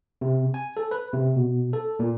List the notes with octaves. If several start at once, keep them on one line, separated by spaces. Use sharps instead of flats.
C3
G#5
A4
B4
C3
B2
A4
A#2